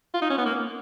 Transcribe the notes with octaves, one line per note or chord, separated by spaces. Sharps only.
F4
D#4
C#4
B3
A#3